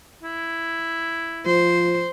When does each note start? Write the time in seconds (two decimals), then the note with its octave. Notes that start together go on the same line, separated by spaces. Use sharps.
0.23 E4
1.46 F3 C5